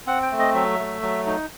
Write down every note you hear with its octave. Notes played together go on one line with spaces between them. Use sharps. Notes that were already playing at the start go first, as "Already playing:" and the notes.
C4 F#5
G5
A3
D#5
F#3 E5
A3
F#3
D#4